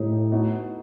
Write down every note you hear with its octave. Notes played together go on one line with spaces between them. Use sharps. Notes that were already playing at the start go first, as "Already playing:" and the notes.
Already playing: A2 D#4 G4
B3 D#4 F#4 A4